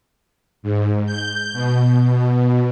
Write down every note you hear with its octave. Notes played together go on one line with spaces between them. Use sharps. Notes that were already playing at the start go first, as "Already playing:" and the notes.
G#2
G6
B2